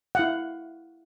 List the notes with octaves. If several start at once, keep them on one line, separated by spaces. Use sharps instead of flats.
E4 F5 F#5